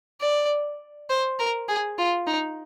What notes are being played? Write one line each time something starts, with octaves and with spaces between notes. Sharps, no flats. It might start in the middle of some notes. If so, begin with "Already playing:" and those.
D5
C5
A#4
G#4
F4
D#4